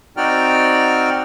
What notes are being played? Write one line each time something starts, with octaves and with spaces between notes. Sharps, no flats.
C4 D#4 F#4 D5 G5 F6